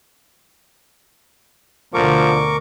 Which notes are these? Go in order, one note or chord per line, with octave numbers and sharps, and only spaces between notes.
D2 B2 D3 F3 A#4 C#6 D6